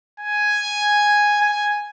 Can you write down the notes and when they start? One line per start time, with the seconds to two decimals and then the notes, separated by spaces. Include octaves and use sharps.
0.20 G#5
1.41 G#5